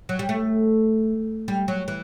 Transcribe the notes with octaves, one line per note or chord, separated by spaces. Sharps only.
F#3
G3
A3
G3
F#3
E3